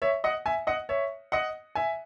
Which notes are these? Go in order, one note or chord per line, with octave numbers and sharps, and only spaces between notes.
C#5 E5
D#5 F#5
E5 G#5
D#5 F#5
C#5 E5
D#5 F#5
E5 G#5